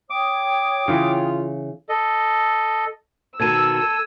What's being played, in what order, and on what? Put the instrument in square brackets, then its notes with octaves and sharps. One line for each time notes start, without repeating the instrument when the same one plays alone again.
[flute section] C#5 G5 D#6 [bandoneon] D6
[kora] C#3 E3 [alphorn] F4
[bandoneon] A4 D#5
[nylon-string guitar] B2 D#3 [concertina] A4 [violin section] E6 [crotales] G#6 D#7